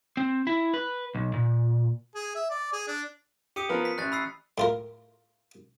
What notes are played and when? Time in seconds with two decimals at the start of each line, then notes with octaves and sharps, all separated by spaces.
0.17 C4
0.47 E4
0.74 B4
1.15 B1
1.34 A#2
2.15 G#4
2.35 E5
2.50 D5
2.73 G#4
2.88 D4
3.56 G4 D#6 C#7 D#7
3.69 F3 B3 A#4
3.85 B6
3.98 A1 F#6 A6
4.12 B5 E6 C7
4.58 A2 F4 A#4